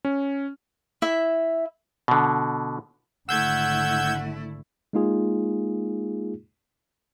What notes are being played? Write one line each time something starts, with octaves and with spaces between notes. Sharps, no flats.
C#4
E4 E5
B2 D3
G#1 D3 A3 E4 F#5 E6 G6 G#6
G#3 A#3 D#4 F4 G#4